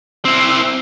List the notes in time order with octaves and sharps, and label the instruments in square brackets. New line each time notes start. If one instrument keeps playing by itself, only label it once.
[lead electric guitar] C4 E4